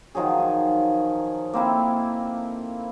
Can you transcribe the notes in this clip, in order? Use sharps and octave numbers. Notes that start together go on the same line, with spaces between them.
D#3 F3 F#3 G#4
A#3 C4 E4 A4